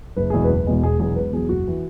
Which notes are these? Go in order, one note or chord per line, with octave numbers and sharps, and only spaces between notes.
F#1 B4
E2 B2 G#3 G#4
B4
F#1
E2 B2 G#3
E1 G#4
E2 B2 F#3 G#4
E1 B4
E2 B2 F#3 G#4
F#1 F#4
E3